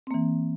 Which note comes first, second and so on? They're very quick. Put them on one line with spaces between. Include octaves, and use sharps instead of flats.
C4 A#3 E3